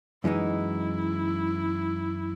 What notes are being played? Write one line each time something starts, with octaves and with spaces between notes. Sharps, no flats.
F#2 E3 G#3 D#4 E4